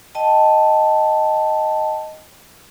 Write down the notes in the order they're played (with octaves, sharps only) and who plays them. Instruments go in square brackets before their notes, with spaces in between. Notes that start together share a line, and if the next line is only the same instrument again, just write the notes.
[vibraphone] D#5 G5 A5